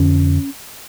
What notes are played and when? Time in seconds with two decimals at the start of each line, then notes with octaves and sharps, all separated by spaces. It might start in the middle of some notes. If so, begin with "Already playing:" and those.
Already playing: F2 D3 C#4